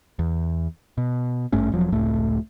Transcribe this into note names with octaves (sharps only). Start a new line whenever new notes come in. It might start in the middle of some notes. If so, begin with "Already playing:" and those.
E2
B2
G#1 G2 A3 C#4
E1 F3 F#3
F1 C#2 A2 A3